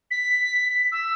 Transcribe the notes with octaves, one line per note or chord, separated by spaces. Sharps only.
B6
E6